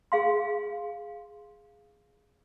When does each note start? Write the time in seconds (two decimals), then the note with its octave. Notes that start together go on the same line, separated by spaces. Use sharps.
0.12 G#4 F5 C6